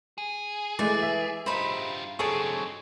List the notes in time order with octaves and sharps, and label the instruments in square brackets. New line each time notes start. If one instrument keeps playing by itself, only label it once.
[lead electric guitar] G#4
[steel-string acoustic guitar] E3 A3 B4 [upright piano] G#3 [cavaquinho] D5
[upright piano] E5
[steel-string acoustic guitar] G2 D#4 [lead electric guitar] G3 F4 [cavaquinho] C5 B5
[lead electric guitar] F#3 C4 [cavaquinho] G#4 A4 C#5 [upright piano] C#6 D7